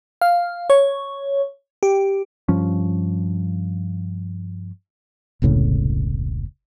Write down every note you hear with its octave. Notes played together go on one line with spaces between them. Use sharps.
F5
C#5
G4
G2 F3 C#4
E1 C2 A2 C#3